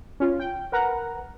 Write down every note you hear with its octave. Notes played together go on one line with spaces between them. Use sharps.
C#4 F4
G5
A#4 B4 F#5 A#5